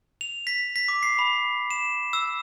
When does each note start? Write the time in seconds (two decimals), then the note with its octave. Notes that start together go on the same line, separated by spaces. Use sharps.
0.21 F7
0.47 B6
0.76 B6
0.88 D6
1.03 C7
1.19 B5
1.71 E7
2.13 E6